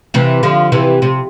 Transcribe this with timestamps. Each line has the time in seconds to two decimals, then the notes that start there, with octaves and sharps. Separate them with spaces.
0.14 C3 E3
0.43 D3 F3
0.72 C3 E3
1.02 C3